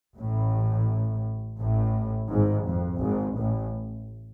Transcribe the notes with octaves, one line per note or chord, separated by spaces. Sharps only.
A1 A2
A1 A2
G#1 G#2
F2
G#1 G#2
A1 A2